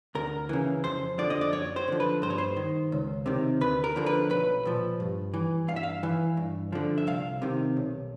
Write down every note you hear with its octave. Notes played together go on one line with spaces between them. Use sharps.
D2 A#4
C#3 E3
F2 C5
D3 F3 D5
D#5
D5
F#2 C#5
C5
D3 F3
B4
G2 C5
C#5
C5
D#3
C#2
C3 D#3
D2 B4
A#4
D3 F3
B4
B1 B4
A#2 F3
G2
E3
G2 F5
E5
F5
E3
G2
D3 F3
E5
C2 F5
C3 D#3
B1